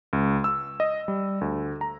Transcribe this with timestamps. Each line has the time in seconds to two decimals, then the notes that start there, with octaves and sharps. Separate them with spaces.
0.13 C#2
0.44 E6
0.80 D#5
1.08 G3
1.41 D2
1.81 A#5